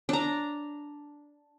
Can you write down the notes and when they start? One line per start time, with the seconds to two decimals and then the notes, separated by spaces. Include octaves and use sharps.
0.09 D4 A#5